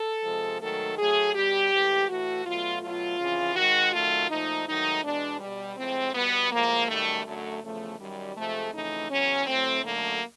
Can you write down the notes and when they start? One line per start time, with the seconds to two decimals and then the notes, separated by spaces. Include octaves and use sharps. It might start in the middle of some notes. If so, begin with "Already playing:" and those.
Already playing: A4
0.24 C3 F3 G#3
0.60 G#2 D#3 F#3 A3 A4
0.97 A2 F#3 A3 G#4
1.34 B2 G3 G4
1.71 G#2 E3 A3
2.08 A2 E3 A3 F#4
2.45 B2 F#3 A3 F4
2.82 B2 F#3 A3 F4
3.19 F2 C#3 E3
3.55 G#2 D#3 G#3 F#4
3.92 F#2 D#3 F#3 A3 F4
4.29 A#2 F3 A3 D#4
4.66 G#2 D#3 F#3 A3 D#4
5.03 E2 B2 G#3 D4
5.40 B2 G3
5.77 A2 F3 G#3 C4
6.14 B2 G3 B3
6.51 A2 F3 G#3 A#3
6.88 F#2 D#3 G3 A3
7.25 F#2 D3 F#3 A3
7.62 E2 C#3 F3 A3
7.98 F#2 D#3 G3
8.35 C3 F3 G#3 A3
8.72 F2 C#3 E3 A3 D#4
9.09 E2 C#3 F#3 C#4
9.46 A2 F#3 A3 C4
9.83 F#2 D3 F#3 A3 A#3